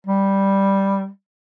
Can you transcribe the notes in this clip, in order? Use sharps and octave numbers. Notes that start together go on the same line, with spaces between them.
G3